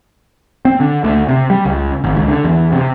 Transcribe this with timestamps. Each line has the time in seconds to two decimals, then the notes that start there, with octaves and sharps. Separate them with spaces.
0.65 C4
0.80 D3
1.04 D2
1.29 C3
1.50 G3
1.65 C#2
2.04 G#1
2.16 C#2
2.28 D3
2.45 E2
2.73 C3